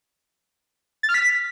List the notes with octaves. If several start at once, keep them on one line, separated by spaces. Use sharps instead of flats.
A6
F6
B6